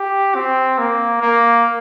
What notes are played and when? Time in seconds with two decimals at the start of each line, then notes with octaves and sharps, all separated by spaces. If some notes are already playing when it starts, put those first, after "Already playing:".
Already playing: G4
0.35 C4
0.79 A#3
1.21 A#3